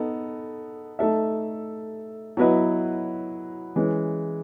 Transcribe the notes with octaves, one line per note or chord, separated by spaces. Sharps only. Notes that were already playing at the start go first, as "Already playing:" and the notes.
Already playing: B3 D#4 A4
A3 D#4 A4 E5
F#3 B3 E4 B4 D#5
E3 G#3 C#4